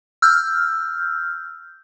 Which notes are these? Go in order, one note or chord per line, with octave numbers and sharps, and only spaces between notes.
E6 F6 G6